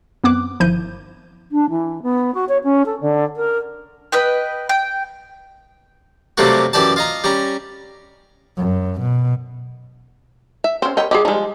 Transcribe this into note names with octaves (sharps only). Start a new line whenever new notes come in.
F#2 B3 C4 D6 F#6
G1 D#3 F3 E4 G6 D#7
D4
E3
B3
F#4
C#5
C#4
A4
D3
A#4
B4 D#5 G5
G5
C3 F#3 G3 A3 A#3 F#4
F#2 E3 G4 D5 A5
F4 D#5 A#5
G3 C#4 A#5
F#2
B2
E5
C4 C#4 C5
A#4 C5 C#5 D#5 G5 B5
G3 G4 G#4 D5 D#5
F3 G3 G#3 D#4